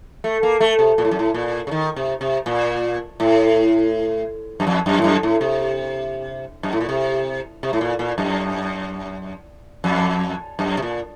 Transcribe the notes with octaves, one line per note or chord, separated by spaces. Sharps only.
A3
A#3
A3
C3
A#2
A2
F#2
A2
A#2
C#3
D#3
C3
C3
A#2
A2
F#2
F2
F#2
A2
F#2
A2
C3
F#2
A2
A#2
C3
C3
A2
A#2
A#2
F#2
F2
F#2
C3
A#2